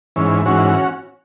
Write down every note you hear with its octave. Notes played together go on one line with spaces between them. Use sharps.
G#2 E3 C#4
G#2 E3 C#4 F#4